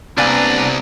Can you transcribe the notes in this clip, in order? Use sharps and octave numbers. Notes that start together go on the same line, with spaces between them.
C2 A#3 B3 D4 B4 D5 G#5 A#5